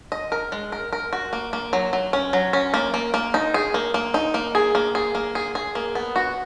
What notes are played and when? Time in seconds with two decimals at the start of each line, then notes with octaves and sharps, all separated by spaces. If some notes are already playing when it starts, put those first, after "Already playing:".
0.12 D#5
0.32 A#4
0.52 G#3
0.72 A#4
0.93 A#4
1.13 F#4
1.33 A#3
1.53 A#3
1.73 F#3
1.93 F#3
2.13 C#4
2.33 F#3
2.53 C#4
2.74 A#3
2.94 A#3
3.14 A#3
3.34 D#4
3.54 G#4
3.74 A#3
3.94 A#3
4.14 D#4
4.34 A#3
4.55 G#4
4.75 A#3
4.95 G#4
5.15 A#3
5.35 G#4
5.55 G#4
5.75 A#3
5.95 B3
6.16 F#4